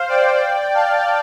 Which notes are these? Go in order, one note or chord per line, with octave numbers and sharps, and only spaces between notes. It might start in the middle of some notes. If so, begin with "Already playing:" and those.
Already playing: C5 F5
D5 G5
F5 A5